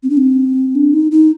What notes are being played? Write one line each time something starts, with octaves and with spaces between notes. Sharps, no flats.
C4
D4
C4
D4
D#4
D#4